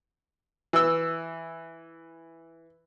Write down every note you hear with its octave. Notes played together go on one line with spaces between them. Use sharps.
E3 E6